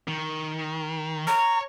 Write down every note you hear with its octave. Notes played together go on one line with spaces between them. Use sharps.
D#3
C#5 A#5